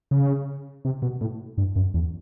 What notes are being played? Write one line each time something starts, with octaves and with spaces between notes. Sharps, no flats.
C#3
C3
B2
A2
G2
F#2
E2